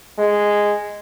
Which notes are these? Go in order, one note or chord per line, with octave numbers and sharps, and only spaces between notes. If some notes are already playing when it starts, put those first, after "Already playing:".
G#3